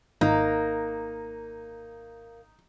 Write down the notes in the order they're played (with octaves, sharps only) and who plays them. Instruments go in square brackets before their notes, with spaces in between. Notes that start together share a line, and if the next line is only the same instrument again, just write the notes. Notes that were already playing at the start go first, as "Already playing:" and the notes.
[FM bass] G#1 [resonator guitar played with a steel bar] A#3 [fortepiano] D#4